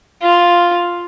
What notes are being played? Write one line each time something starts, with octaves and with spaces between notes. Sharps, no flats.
F4